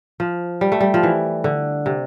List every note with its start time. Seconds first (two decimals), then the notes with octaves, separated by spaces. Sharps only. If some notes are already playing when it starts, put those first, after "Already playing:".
0.20 F3
0.61 G3
0.72 A3
0.80 G3
0.94 F3
1.03 E3
1.44 D3
1.86 C3